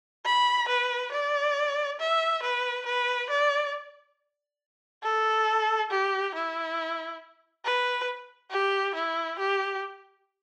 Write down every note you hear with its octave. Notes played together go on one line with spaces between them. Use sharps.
B5
B4
D5
E5
B4
B4
D5
A4
G4
E4
B4
G4
E4
G4